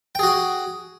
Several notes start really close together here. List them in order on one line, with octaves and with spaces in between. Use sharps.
G5 G#4 F#4